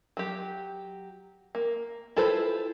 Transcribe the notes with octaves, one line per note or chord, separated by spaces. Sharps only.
F#3 G4
A#3
E4 F4 A4 B4 C5